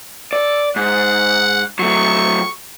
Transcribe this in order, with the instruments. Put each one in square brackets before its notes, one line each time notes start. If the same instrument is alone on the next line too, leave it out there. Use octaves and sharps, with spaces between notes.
[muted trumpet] A4 [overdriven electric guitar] D5
[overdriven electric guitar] G#2 [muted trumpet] F#5
[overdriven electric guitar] F#3 A3 [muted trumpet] C#6